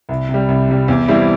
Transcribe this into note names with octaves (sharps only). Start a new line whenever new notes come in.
C2
C3
G3
C2
C3 G3
E2
E3 G3 C4 E4